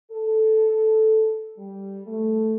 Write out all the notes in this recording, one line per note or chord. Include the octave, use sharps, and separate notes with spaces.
A4
G3
A3